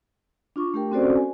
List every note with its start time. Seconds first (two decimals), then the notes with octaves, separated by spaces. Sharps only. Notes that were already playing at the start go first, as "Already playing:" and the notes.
0.56 D4 F4 C#6 D6
0.74 A3 D4 G4 A#4 G5
0.91 C4 C#4 F#4 A4 C5 D5
1.16 G#5